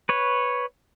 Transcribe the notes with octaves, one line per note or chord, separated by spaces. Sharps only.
B4 C#5